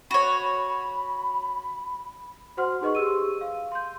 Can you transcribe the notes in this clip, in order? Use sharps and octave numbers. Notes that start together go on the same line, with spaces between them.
F#4 C#5 B5
F#4 C5 F#5 C6 F6
D#4 G#4 B4 D#5 C6 C#6
G4 G#4 E6 D#7
F5
C6 G6